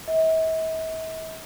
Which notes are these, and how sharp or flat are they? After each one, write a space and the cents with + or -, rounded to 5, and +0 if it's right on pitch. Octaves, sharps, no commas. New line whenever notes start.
E5 -45